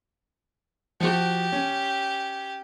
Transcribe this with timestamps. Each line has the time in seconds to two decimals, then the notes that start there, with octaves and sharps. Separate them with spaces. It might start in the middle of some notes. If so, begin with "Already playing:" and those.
1.00 F3 F#4 G4
1.52 C#4